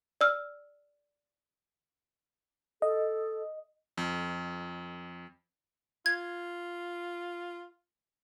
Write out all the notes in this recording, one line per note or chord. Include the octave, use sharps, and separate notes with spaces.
D5 E6 F6
A4 D#5
F2
F4 G#6